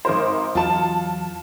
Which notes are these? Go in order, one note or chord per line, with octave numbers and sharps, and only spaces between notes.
G#1 A#4 C5
E2 F#3 F4 A5